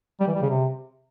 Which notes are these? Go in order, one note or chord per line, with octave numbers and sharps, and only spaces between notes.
G3
E3
G3
C#3
C3